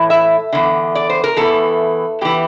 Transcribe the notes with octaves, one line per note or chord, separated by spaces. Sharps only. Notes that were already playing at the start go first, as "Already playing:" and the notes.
Already playing: A2 E3
E5
E2 D3
D5
C5
A#4
E2 E3 A4
E2 E3 G4